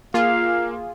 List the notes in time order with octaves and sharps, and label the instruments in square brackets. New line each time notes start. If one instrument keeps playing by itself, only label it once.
[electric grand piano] A#3 [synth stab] F4 G#4 [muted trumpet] F5